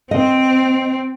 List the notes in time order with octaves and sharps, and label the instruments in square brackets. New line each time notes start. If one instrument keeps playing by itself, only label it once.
[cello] C4 [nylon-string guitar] D#5